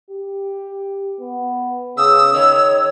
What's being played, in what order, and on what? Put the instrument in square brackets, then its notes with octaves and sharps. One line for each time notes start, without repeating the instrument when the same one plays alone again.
[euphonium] G4
B3
[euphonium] C#3 [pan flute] D#6 [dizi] E6
[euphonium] D#3 [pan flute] C#5